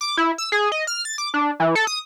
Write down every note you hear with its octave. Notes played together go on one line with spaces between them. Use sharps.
D6
E4
E6
G#4
D#5
F6
A6
D6
D4
E3
A4
D#6